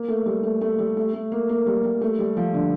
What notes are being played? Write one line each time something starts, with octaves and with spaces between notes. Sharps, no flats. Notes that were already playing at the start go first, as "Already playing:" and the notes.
Already playing: A#3
A3
G3
A3
A3
G3
A3
A3
A#3
A#3
G3
G3
A3
G3
F3
D3